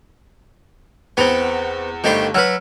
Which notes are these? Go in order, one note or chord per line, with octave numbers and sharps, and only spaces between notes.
E2 B3 C4 F7
G1 D#3 G3 A3 C5
F#3 B4 E6 F6